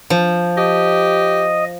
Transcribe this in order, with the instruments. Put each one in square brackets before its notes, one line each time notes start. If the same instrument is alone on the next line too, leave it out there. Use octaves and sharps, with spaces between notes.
[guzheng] F3
[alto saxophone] G4 [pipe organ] D#5